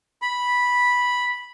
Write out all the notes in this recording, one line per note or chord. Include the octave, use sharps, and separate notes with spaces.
B5